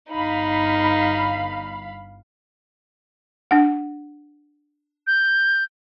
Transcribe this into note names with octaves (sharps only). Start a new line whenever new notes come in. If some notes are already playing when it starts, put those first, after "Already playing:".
G1 D#4 F5 B5
D4 F#5
G6